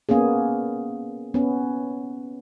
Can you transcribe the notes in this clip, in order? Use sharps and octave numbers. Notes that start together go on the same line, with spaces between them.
A#3 B3 C#4 G#4
B3 C#4